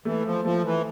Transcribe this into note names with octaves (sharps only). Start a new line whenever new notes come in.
E3 A3
F3
F3 A3
E3